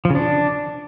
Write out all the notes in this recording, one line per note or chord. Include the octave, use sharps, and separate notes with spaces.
F3
C#3
D4